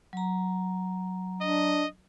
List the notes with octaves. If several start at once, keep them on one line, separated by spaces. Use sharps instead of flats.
F#3 A#5
D4 D#5